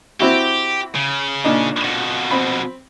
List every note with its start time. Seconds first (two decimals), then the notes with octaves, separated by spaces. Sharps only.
0.20 C4 E4 F#4 G4
0.95 C#3
1.44 A#2 D4 D#4
1.84 F2 B2
2.31 C4 B5